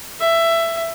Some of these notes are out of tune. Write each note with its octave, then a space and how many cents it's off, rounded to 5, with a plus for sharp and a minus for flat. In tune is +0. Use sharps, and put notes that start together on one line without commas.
E5 +15